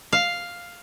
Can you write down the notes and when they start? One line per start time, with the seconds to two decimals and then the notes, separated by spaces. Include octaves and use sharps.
0.13 F5